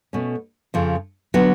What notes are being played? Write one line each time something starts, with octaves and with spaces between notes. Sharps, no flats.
B2 A3 C#4
F2 C#3 F3
D3 F#3 B3 F#4